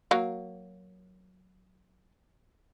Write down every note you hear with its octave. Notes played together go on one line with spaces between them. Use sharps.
F#3 A#3